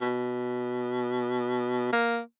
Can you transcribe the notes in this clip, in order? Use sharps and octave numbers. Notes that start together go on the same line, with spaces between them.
B2
A#3